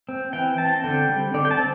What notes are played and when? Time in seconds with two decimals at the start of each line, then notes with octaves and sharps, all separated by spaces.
0.09 C4
0.33 E3 G5
0.58 C4 A5
0.84 D3 G5
1.09 G3 C4
1.34 D3 D5
1.45 G5
1.51 A5
1.59 C4